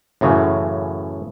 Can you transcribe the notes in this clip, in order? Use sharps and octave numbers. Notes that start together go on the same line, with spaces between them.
F#2 A2 C#3 E3 F#3